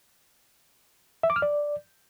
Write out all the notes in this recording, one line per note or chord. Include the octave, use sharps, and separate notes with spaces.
E5
D6
F6
D5